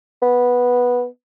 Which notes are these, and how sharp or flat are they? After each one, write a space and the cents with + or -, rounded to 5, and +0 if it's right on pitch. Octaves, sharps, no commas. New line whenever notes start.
B3 -10